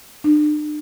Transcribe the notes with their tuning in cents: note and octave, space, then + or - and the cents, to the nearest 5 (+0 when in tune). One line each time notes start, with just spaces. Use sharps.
D4 +40